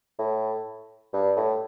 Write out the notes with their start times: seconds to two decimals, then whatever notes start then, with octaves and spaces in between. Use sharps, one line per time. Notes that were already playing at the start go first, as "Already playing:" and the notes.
0.19 A2
1.14 G2
1.37 A2